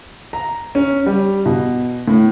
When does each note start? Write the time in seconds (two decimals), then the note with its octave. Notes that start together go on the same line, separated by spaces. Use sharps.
0.33 A#5
0.75 C#4
1.06 G3
1.46 B2
2.08 A2